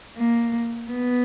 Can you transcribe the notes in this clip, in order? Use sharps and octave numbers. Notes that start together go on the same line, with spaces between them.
A#3
B3